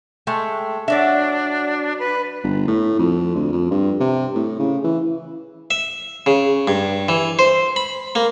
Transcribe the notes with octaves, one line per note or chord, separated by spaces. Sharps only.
G#3 A3 G5
F#3 D4 F#4 D5 E5
B4
G1
A2
F2
D2
F2
G2
C3
A2
C#3
E3
E5
C#3
G2
E3
C5
B5
A#3